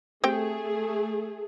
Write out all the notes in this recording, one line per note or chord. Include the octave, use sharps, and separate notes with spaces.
A3 C4 G4 G#4 G5